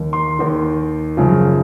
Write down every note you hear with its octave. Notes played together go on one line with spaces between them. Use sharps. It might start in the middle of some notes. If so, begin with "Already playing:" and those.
Already playing: D#2 D#3
C6
D#2 D#3
F#2 C#3 F3